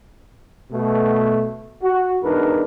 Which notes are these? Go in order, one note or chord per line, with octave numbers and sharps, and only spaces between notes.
B2 A3
F#4
E2 G#2 D4 D#4 A#4 B4